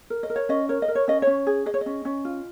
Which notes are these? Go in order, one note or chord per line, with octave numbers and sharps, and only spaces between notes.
A#4
D#5
A#4
C#5
C#4 D#5
A#4 C#5
D#5
A#4
C#5
C#4 D#5
C#4 C#5
G#4
G#4 D#5
C#5
C#4 D#5
C#4
F4